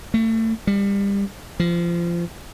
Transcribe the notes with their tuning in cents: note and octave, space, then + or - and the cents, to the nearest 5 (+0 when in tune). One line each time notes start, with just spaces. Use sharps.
A3 +30
G3 +30
F3 -25